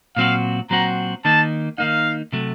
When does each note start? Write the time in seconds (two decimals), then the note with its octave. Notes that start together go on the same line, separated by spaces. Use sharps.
0.17 A#2 F#3 C4 F#4 F5
0.70 A#2 F#3 C4 F#4 A#5
1.25 D#3 A#3 D#4 A5
1.78 D#3 A#3 D#4 F5
2.32 C3 F#3 A3